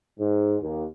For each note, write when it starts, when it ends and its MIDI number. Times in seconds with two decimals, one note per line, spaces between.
0.19 0.56 44
0.61 0.85 39